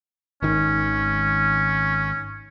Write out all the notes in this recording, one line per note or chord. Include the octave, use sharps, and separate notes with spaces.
G#1 D#3 C#4